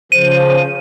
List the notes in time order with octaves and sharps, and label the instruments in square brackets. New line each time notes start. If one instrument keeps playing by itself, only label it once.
[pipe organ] C#3 F3 [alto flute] C5 [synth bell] D#7